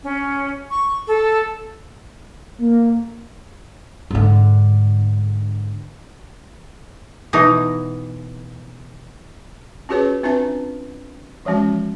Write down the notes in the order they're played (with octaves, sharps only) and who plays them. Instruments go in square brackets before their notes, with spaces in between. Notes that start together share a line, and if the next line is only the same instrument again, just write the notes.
[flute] C#4
C#6
A4
[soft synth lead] A#3
[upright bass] G#2 D3
[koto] B2 E3 D#4
[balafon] C#4 F4 F#4 G#4 B4 C#5
C4 D4 F4 B4 E5 A5
E3 F3 G#3 C#4 F#4